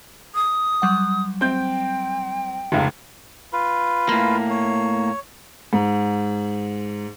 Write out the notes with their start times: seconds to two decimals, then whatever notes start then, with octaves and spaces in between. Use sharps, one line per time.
0.35 D#6
0.82 F#3 G3 F#5
1.41 C4 G5 G6
2.72 F1 C#2
3.53 F4 B4
4.09 A2 A#3
4.50 C#5
5.73 G#2